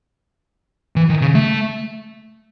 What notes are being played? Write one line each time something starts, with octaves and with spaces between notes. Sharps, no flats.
E3
D#3
C#3
A3